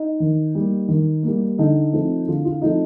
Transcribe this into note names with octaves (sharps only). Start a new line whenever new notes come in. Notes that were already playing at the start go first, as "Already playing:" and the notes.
Already playing: D#4
D#3
G3 A#3
D#3
G3 A#3
D3 D#4
F3 A3 C4
D3 F4
F4
F3 A3 C4 D#4